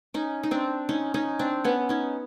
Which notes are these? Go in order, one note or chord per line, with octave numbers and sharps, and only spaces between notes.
C#4 D#4
D#4
C4 D4
C#4 D#4
C#4 D#4
C4 D4
B3 C#4
C#4 D#4